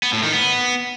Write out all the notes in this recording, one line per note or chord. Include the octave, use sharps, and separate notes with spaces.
B3
A2
D#3
B3